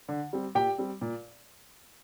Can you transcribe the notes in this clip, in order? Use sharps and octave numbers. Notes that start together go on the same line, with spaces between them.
D3
G3 C4
A#2 G4 G5
G3 C4
A#2